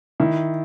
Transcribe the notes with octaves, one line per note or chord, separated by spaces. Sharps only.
D#3 E4